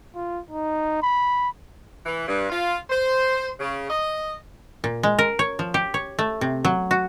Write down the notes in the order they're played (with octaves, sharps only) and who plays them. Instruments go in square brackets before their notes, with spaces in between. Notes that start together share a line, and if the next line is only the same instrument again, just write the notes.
[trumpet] F4
D#4
B5
[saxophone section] E3
G2
F4
C5
C#3
D#5
[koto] A#2
G#3
A#4
C#5
F3
G4
C#5
A3
C3
F#3
F#4